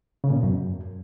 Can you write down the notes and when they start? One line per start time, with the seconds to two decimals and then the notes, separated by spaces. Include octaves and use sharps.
0.24 C#3
0.30 A#2
0.37 B2
0.43 F#2